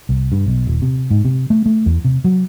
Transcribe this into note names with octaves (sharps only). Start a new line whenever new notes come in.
C2
G2
B1
D#1
C3
G#2
C3
A3
A3
E2
C3
F#3